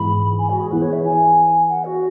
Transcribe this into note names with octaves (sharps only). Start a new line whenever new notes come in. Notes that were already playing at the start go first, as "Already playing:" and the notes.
Already playing: G#2 E3 G#3 B3 B5
G#5
F#4
G#4
E3 B3 E4 G#4 B4
C#5
E5
G#5
F#5
F#4